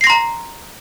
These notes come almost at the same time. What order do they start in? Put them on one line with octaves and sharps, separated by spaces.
C7 A#6 C6 A#5